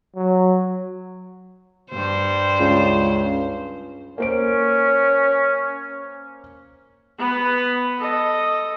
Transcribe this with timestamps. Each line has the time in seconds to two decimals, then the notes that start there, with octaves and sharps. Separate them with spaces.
0.16 F#3
1.91 G2 C5
2.60 C#2
4.18 A#3 C#4 C5 D7
7.19 B3 B4
7.99 A4 D#5